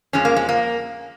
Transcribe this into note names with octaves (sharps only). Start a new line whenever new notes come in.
F2 F3 G#3 C#4
A#3
G#3
A#3